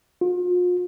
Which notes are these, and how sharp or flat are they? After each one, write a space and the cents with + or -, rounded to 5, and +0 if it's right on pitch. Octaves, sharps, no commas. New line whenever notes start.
F4 +40